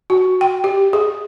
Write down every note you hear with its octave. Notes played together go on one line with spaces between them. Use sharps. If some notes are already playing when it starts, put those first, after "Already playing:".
F#4
G5
G4
G#4